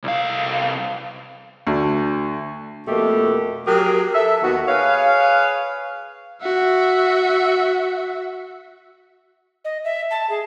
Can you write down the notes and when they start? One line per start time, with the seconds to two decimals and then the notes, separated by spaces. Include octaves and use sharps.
0.04 C2 F5
1.67 D2
2.87 F2 B2 A3 A#3 G4
3.67 F#3 G4 G#4 A#4
4.14 A4 E5
4.43 D#2 D#3 B3 F#4
4.68 G#4 B4 C#5 F5
6.42 F#4 E5
9.65 D#5
9.85 E5
10.11 A5
10.29 G#4